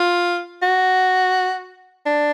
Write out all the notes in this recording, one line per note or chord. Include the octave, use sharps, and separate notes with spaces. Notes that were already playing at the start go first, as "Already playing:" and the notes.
Already playing: F4
F#4
D4